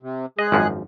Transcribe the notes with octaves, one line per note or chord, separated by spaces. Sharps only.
C3
G#3 G#4 D#5 F#6
G#1 F#2 F3